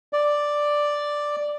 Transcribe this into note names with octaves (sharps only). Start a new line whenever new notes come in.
D5